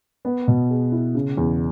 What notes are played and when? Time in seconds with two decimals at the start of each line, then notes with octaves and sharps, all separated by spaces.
0.25 B3
0.48 B2
0.70 G#4
0.92 E4
1.15 C#3
1.37 E2